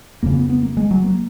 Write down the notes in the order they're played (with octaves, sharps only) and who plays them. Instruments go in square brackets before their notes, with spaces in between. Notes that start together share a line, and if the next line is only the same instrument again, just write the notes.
[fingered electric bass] F2 C#3 A#3
B3
B3
A#3
G#3
F#3
A#3